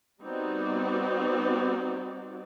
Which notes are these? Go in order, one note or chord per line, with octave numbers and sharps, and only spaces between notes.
G3 B3 C4 D#4 F#4 D5